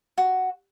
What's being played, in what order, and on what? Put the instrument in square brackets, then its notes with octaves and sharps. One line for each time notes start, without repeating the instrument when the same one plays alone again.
[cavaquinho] F#4